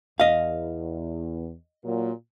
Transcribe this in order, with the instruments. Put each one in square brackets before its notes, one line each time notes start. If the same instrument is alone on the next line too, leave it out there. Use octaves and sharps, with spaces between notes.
[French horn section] E2 [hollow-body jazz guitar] D#5 F5
[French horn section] A#2 F#3 A#3